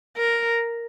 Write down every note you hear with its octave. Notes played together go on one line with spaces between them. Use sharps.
A#4